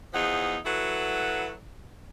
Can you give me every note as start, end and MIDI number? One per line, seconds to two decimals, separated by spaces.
0.13 0.57 40
0.13 0.57 53
0.13 0.57 63
0.13 0.57 68
0.13 0.57 78
0.65 1.53 54
0.65 1.53 64
0.65 1.53 66
0.65 1.53 69
0.65 1.53 71